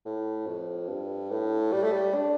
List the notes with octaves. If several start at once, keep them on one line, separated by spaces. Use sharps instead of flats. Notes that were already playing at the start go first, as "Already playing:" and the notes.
A2
F2
G2
A2
G3
A3
G3
D4